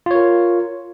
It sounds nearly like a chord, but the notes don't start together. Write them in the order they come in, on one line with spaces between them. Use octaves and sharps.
F4 C#5 A#4